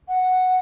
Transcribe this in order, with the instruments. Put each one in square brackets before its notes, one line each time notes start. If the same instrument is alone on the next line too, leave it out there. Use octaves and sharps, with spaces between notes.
[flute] F#5